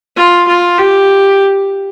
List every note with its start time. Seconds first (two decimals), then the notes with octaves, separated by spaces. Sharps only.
0.16 F4
0.47 F4
0.78 G4